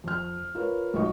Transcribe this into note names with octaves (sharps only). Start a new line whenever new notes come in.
F2 F6
F4 A#4 B4 C#5
B1 F4 F#4 D#5 C#6